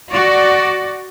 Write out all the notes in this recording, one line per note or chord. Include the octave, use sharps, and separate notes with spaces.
F#4 D5